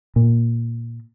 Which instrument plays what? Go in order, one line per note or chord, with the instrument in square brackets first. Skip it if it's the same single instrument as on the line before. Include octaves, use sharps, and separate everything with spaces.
[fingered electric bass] A#2